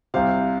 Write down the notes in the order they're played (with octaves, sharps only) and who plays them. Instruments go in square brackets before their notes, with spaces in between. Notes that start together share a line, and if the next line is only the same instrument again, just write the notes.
[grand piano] C2 C3 C5 F5